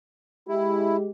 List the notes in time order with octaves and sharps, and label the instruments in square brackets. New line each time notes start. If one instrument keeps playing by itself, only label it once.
[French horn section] G#3 G4 [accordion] E4